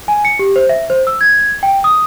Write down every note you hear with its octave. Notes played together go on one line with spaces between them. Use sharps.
G#5
C#7
G4
C5
E5
C5
E6
G#6
G5
D#6